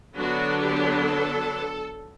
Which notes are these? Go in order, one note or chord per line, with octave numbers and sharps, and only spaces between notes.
D3 F#3 B3 D4 F#4
G4
A4